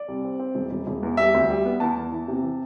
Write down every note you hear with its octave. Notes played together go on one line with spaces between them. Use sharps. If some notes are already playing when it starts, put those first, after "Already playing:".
Already playing: D5
C2
C4
C4
E1
E1
E1
E2
G3 E5
D2
G3
B3
E2 A5
E2
E3
C3
E3